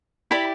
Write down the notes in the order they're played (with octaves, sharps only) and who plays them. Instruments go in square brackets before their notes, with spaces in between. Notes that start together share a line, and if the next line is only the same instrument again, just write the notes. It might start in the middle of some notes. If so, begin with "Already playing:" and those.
[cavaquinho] E4 G4 D5 B5